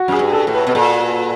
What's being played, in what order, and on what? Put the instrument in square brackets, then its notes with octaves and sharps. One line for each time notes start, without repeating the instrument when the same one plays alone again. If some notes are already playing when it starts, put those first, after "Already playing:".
Already playing: [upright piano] F#4
[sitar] F#2 [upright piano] G#4
[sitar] G2
[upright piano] A4
[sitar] A2
[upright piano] B4
[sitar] B2
[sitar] A#2 [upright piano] A4